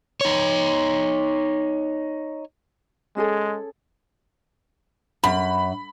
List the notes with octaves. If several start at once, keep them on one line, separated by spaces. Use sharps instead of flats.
D#4 C#5
G#3 C#4 G#4 A4
F#2 B5